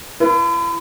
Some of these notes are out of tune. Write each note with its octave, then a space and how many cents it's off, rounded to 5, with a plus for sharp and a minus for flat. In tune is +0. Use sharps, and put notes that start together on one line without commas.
E4 +40 B4 -15